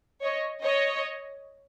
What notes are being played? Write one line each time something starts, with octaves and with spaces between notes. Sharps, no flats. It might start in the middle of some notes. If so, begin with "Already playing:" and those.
C#5 D#5
C#5 D#5